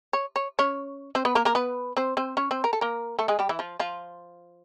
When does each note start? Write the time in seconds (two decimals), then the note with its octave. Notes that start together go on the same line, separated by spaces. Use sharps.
0.13 C#5
0.36 C#5
0.59 C#4 C#5
1.15 C4 C5
1.25 B3 B4
1.35 A#3 A#4
1.45 A#3 A#4
1.55 B3 B4
1.97 C4 C5
2.17 C4 C5
2.37 C#4 C#5
2.51 C4 C5
2.64 A#4
2.73 A4
2.81 A#3 A#4
3.19 A3 A4
3.28 G#3 G#4
3.39 G3 G4
3.49 E3 E4
3.59 F3 F4
3.79 F3 F4